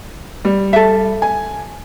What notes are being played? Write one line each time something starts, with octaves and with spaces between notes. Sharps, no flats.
G3
A4 E5
G#5